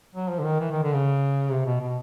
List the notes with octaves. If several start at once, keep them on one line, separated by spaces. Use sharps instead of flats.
F#3
F3
D3
D#3
E3
D#3
D3
C#3
C3
B2
B2